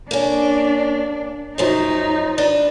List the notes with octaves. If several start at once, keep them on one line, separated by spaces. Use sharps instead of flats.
A#3 C#4 D4
F#2 F3 F#3 D#4
D4 B4